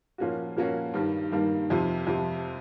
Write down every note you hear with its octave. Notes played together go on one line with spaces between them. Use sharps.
A#2 F3 A#3 C#4 F#4
A#2 F3 A#3 C#4 F#4
G2 D#3 G3 A#3
G2 D#3 G3 A#3
F2 C3 F3
F2 C3 F3